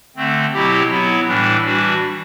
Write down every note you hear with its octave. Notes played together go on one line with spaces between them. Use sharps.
D3 A3 C4
B2 F#3 C4 E4 G4
F#3 B3 E4
A2 E3 G3 D4
E3 G3 D4 F#4